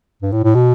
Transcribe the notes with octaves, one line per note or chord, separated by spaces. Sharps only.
G2
A2
A2
B2